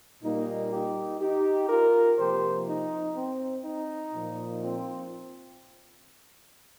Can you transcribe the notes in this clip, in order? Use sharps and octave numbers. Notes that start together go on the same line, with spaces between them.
A#2 G3 A#3 D#4
D#4 G4
D#4 G4
F4 A#4
C3 F3 A#3 G4 C5
D#4
C4
D#4
A#2 F3 A#3
C4 F4